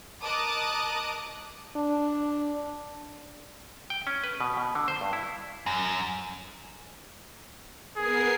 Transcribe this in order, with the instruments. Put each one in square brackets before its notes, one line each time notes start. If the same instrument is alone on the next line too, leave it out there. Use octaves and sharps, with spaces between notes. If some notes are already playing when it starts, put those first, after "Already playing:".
[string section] A#4 D#5 A5 D6 D#6 F#6
[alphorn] D4
[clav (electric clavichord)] G5
C#4
B4
B2
B2
D3
C5
G2
E4
[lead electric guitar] F#2
[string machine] B3 A#4 C7 [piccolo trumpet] G#4